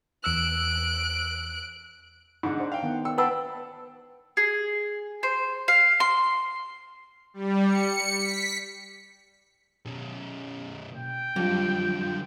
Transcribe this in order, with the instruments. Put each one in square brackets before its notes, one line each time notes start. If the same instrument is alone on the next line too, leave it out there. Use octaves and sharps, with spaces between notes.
[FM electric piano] E2 E6 [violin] F#6 D7
[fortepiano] G#2 D3 [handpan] D#4 F#5
[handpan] D4 C5
[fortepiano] F5 G5
[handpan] D#3 B3 F#5
[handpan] D5 [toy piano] G5 [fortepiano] E6
[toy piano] B4 F#5 E6 [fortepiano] G5 A5 B5
[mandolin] G#4
C5
F5
C6
[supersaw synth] G3
C#7
B6
[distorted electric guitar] B2 C#4
[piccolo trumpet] G5
[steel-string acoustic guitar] F2 [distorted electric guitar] D3 F4 [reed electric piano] F#3 G3